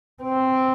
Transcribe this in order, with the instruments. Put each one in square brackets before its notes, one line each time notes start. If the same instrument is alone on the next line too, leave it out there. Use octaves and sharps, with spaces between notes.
[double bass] C4